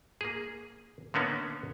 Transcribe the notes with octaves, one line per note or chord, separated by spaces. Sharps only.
A#3 G#4
D3 A#3 B3 C#4 D#4